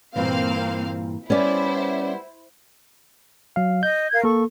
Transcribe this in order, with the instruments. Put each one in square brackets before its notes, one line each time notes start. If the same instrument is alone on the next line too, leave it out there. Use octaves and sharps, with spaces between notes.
[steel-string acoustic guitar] G2 A#2 E3 [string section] A#3 C4 F5
[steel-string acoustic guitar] G3 B3 [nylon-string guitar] C#4 D5 [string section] E4 C5
[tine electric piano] F#3 F5
[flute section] D#5 [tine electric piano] G6
[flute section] A#4 F5 G#6
[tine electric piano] A#3 A4 [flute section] C#6